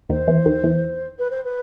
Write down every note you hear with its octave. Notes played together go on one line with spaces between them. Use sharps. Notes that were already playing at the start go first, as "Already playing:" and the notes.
D#2 D#3 C5
E2 E3
D#2 D#3
E2 E3
B4
C5
B4